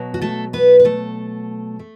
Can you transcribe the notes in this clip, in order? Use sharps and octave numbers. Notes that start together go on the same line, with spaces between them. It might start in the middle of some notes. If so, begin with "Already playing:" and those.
Already playing: B2 F#3
F#4
A3 A4
B3 B4
B4
A3 A4
A3